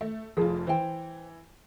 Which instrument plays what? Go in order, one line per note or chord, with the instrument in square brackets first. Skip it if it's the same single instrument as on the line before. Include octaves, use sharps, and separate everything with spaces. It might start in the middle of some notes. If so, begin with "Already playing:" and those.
[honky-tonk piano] A3
[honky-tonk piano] F1 F2 F4 [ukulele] G#4
[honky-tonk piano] E3 [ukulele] C5 G5